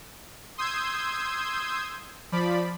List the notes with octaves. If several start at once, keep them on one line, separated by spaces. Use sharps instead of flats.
C6 D#6 E6 G6 G#6
F3 D5 B5